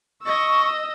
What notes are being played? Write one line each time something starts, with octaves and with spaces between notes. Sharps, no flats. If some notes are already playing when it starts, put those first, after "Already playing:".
D#5 C#6 E6